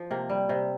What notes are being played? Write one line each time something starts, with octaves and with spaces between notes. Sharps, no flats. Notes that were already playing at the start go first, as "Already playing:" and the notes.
Already playing: F3
C3 A#3
G3
C3